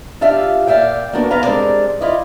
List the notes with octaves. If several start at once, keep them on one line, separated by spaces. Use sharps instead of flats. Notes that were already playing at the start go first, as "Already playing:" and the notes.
D4 F4 G4 E5 F5
A#2 D5 E5 F5 G5
A#3 B3 D4 F#4 A#4
E2 B3 B4 F5 A#5
G3 G#3 C4 D4 A#4 D5
E4 F4 D5 D#5